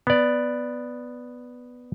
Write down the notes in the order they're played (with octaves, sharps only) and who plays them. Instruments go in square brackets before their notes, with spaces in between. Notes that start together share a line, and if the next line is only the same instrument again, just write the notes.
[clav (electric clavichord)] B3 D5